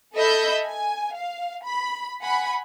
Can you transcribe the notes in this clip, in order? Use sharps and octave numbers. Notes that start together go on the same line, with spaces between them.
A4 D#5 E5 B5 E6 G6
G#5
F5
B5
F#5 G#5 B5